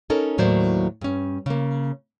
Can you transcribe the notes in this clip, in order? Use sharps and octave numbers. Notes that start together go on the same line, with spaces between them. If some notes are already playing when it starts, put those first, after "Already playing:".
C#4 D#4 A4 A#4 C#5
D#2 A2 F#3 A#3 C5 D5
G2 C#4
C#3 A#3